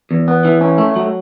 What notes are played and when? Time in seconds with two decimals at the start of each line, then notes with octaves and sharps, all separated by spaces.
0.11 E2
0.28 B3
0.45 E3
0.61 C#4
0.78 A3
0.96 F#3